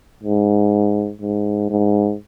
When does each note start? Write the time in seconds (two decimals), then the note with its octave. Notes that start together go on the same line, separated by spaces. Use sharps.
0.24 G#2
1.22 G#2
1.70 G#2